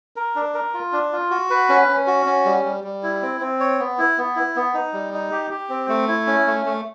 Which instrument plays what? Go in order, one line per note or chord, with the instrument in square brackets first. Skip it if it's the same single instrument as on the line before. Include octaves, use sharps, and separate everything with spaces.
[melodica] A#4
D4
A#4
F4
D4
F4
F#4
B4
C#4
C#4
F#4
C#4
G3
G3
G3
E4
C4
C4
C#5
B3
E4
B3
E4
B3
D#4
G3
D#4
G4
G4
C4
A3
E4
C#4
A3
A3